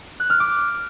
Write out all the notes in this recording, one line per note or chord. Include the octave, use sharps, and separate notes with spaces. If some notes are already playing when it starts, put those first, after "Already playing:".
F#6
F6
D6